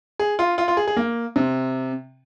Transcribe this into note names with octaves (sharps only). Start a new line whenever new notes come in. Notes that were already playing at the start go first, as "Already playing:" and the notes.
G#4
F4
F4
F4
G#4
G#4
A#3
C3